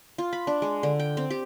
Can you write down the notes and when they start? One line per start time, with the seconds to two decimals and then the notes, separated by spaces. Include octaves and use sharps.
0.18 F4
0.33 B5
0.47 D4
0.62 G#3
0.83 D3
0.99 G5
1.17 C4
1.30 G4